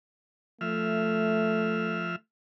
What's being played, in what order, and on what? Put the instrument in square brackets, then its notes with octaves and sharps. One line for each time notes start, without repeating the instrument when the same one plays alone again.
[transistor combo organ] F3 E5 F6 [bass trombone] A3